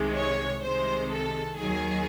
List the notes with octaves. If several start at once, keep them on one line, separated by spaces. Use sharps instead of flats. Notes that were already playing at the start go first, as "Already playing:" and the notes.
Already playing: C2 C3 D#3 G#3
C#5
C2 C3 D#3 G#3 C5
A4
D#2 D#3 F#3 G#4